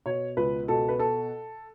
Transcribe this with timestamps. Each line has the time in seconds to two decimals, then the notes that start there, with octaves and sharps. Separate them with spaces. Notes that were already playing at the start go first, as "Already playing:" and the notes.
0.06 B2 C#5
0.37 C#2 B4
0.68 B2 A4
0.88 B4
0.99 A4